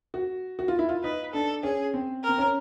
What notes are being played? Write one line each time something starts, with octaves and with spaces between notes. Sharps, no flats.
F#4
F#4
F4
E4
F4
D#4 B4
D4 A4
C#4 G#4
C4
A#4
C4
C#4